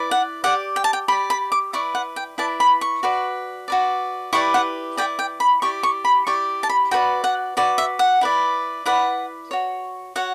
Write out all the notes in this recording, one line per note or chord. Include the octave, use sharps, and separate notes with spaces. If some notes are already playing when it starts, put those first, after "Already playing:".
Already playing: E4 B4 D5
F#5
G4 D5 F#5
G5
A5
G5
G4 D5 B5
B5
D6
E4 B4 D5 C#6
F#5
G5
E4 B4 D5 A5
B5
C#6
F#4 B4 D5
F#4 B4 D5
E4 G4 B4 D5 C#6
F#5
E4 G4 B4 D5 G5
G5
B5
E4 G4 D5 C#6
C#6
B5
E4 G4 D5 C#6
A5
B5
F#4 B4 D5 G5
F#5
F#4 B4 D5
E5
F#5
E4 B4 D5
E4 B4 D5 F#5
F#4 C#5
F#4 C#5 F#5